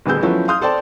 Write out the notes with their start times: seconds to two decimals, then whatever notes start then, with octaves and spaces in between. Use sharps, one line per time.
0.06 D#1 D2 B3 G#4 E6 G6
0.23 F3 F#3 A3 B3 C#4 E4
0.48 F5 C6 D#6 F6 G6
0.61 A4 C5 D5 G5 A5